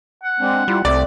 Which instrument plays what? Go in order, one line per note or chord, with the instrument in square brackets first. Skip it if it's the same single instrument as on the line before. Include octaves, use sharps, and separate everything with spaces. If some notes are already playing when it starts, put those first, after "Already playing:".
[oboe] F#5
[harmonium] G#3 C4 D4
[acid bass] G3 [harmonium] E4 F4
[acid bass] C2 [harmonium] A3 C4 [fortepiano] D5